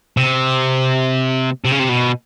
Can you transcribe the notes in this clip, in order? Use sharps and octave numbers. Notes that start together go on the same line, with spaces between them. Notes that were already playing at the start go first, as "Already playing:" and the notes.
C3
C3
C#3
C3
B2